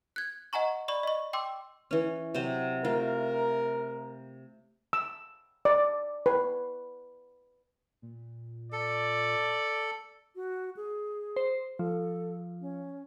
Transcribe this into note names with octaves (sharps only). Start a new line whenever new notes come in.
F#6 G#6
D#5 F#5 G#5 A#5 C#6
D5 B5 C#6
D#5 C#6
G5 C6 D6 E6
E3 C#4
C3 F#3 C5
A3 F4 A#4
E6
D5
B4
A#2
A4 D5
F#4
G#4
C5
F3 A4
C#4